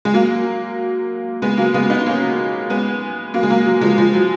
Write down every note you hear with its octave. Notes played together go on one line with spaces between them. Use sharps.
G#3
F#3 A#3
G#3 B3
F#3 A#3
G#3 B3
B3 D#4
A#3 C#4
G#3 B3
F#3 A#3
G#3
F#3 A#3
F#3
F3 G#3
F3 G#3
F#3